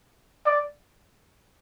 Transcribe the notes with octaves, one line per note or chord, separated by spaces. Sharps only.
D5